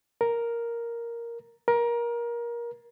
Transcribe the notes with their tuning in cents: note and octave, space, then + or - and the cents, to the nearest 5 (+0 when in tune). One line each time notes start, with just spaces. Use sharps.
A#4 +0
A#4 +20